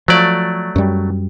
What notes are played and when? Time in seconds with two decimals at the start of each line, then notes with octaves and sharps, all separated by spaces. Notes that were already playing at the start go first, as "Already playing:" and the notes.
0.08 F3 F#3 A3 D5
0.76 F#2 G3